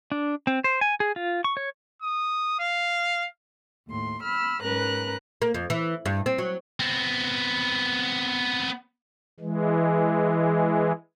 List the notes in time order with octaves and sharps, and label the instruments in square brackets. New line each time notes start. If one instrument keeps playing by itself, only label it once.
[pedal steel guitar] D4
C4
C5
G#5
G#4
F4
C#6
C#5
[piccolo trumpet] D#6
F5
[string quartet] D#2 A2 C6
B5 E6 F6
G#2 C#4 A#4 B4 A#5 F#6
[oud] A#3
F2
E3
G2
C4
F#3
[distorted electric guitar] B3 C4
[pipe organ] E3 G#3